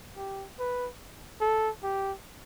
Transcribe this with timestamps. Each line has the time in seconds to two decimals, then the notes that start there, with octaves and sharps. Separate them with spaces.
0.17 G4
0.59 B4
1.41 A4
1.83 G4